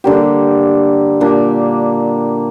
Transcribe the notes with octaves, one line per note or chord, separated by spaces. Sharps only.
D3 G3 A#3 G4
A#2 A#3 D4 G4